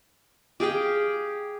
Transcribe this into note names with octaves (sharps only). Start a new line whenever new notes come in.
G4 G#4 F5 G5